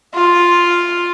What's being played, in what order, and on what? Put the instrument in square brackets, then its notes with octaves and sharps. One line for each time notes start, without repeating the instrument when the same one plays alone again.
[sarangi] F4